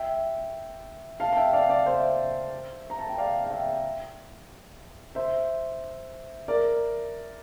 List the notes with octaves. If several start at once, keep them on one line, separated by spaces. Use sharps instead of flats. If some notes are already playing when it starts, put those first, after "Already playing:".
Already playing: E5 G5
F5 A5
A5
E5 G5
D5 F5
D5 F5
C5 E5
A#5
A5
G5
D5 F5
F5
E5 G5
C5 E5
A#4 D5